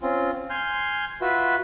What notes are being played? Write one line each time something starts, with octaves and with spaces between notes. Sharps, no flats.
C4 C#4 F4
G#5 C6 F6 G6
F4 F#4 B4 E5 B5